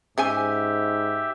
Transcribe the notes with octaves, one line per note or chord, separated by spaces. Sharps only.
G#2 C#4 G4 C5 E5 G#5